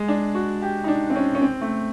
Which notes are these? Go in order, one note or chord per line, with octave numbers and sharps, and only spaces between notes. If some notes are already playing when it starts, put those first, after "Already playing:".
Already playing: G#3
D4
F#4
G4
D#4
D4
C4
C#4
C#4
C4
A3